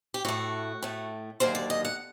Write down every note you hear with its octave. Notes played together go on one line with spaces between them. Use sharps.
G4
A2 A3 F#4
A2 A3
D#2 D3 F#3 A#3 C5
D5
D#5
F#5